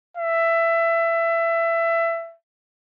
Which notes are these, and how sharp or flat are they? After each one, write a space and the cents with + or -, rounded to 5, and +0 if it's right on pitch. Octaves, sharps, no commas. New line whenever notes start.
E5 +20